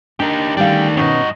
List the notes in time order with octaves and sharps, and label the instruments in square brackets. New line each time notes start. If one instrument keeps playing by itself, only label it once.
[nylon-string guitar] D4 A#4 [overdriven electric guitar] D#4 G4
[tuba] D#3 [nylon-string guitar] G3 C#4 F5 [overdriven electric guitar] A3 D4 [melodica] G5
[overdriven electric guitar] G2 D#5 [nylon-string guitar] B2 C#4 [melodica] D#4 F#4